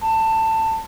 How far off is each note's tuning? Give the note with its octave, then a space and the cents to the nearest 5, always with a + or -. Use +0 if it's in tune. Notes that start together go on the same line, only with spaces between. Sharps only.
A5 +20